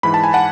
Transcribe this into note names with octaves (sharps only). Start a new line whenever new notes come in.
G#2 E3 B5
A5
G#5
F#5 A5